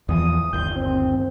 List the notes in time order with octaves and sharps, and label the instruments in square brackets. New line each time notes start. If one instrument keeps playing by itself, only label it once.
[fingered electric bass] E2 E3 F3 [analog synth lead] D#6
[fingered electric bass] G1 D#2 [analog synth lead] G6
[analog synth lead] C4